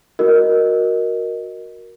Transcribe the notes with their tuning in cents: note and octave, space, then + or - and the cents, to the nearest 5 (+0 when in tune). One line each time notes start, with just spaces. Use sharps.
F#4 -10 A#4 +0 D#5 +0